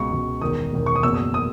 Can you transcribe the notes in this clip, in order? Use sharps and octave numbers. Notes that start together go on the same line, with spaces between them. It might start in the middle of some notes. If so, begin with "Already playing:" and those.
Already playing: C#2 B2 C#6
C#2 B2
E1 E2 D#3 D#6
E1 E2 D#3
C#6
D#6
F#1 E2 B2 E6
D#6
D#6